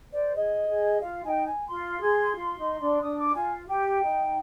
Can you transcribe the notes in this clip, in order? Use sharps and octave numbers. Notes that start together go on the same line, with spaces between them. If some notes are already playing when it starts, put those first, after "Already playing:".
C5 D5
G#4 D#5
G#4
F4 F5
D#4 G5 G#5
G#5
F4 C6
G#4
F4
D#4
D4
D4 D#6
D6
F4 G#5
G4 G5
D#4